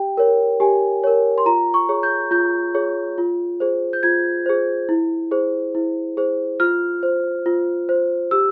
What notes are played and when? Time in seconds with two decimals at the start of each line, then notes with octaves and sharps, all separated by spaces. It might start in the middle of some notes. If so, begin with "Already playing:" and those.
Already playing: G4 G5
0.17 A#4 C#5
0.60 G4 G#5
1.04 A#4 C#5
1.38 C6
1.46 F4 A#5
1.74 C#6
1.89 G#4 C#5
2.03 G6
2.31 F4 G6
2.74 G#4 C#5
3.18 F4
3.60 G#4 C5
3.93 G6
4.03 F4 G#6
4.46 G#4 C5
4.89 E4
5.31 G#4 C5
5.75 E4
6.17 G#4 C5
6.60 F4 F6
7.03 C5
7.46 F4
7.89 C5
8.31 G4 E6